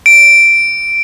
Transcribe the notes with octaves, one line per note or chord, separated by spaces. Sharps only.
D7